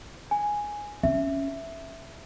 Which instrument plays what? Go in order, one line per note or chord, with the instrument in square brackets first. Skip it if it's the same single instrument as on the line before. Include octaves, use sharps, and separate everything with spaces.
[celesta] G#5
[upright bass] C#4 [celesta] E5